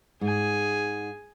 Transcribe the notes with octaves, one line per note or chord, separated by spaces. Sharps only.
G#2 G#4 G#5